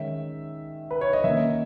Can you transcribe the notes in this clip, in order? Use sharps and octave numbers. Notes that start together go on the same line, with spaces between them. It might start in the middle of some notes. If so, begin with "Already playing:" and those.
Already playing: D#3 G#3 C#4 E5
B4
C#5
D#5
D#3 A#3 C#4 E5